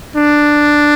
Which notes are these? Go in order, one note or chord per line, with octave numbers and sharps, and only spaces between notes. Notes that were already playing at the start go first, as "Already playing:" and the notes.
D4